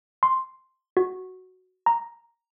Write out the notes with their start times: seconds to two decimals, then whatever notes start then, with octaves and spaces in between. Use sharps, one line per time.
0.23 C6
0.97 F#4
1.86 A#5